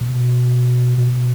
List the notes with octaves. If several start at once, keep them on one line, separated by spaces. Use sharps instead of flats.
B2
B2